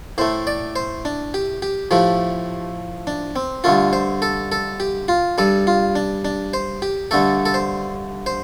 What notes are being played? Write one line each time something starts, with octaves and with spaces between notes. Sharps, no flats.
A2 A3 C5
D5
C5
D4
G4
G4
A2 F3 A3 G4
D4
C4
G2 D3 A3 F4
C5
A4
A4
G4
F4
G2 G3 A4
F4
D4
D4
C5
G4
G2 D3 A3 A4
A4
C5
C5